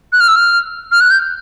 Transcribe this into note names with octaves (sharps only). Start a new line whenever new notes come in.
F#6
F6
E6
F6
F6
F#6
G6